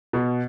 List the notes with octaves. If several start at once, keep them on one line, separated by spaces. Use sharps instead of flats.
B2